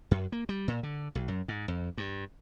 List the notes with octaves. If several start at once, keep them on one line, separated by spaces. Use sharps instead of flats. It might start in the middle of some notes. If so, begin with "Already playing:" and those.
F#2
A#3
G3
A#2
D3
B1
F#2
G#2
F2
G2